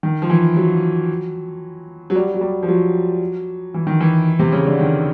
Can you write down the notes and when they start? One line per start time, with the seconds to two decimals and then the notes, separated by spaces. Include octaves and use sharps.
0.03 D#3
0.22 F3
0.30 E3
0.56 F#3
2.10 F#3
2.15 G3
2.34 F#3
2.41 G3
2.63 F3
2.68 F#3
3.74 E3
3.87 D#3
4.01 E3
4.39 C3
4.52 C#3
4.66 D3
4.79 D#3